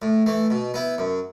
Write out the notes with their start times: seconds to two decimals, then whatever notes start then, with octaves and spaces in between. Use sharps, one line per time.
0.02 A2
0.26 E3 A3
0.50 B2
0.74 B3 E4
0.98 F#2